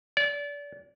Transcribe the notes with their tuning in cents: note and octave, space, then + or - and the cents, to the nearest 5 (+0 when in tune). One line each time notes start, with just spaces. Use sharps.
D5 -30